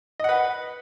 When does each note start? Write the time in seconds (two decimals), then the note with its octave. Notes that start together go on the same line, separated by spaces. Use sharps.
0.20 D#5
0.24 F#5
0.29 B4